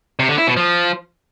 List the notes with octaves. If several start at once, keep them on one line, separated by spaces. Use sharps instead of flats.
C3
D3
E4
B2
F3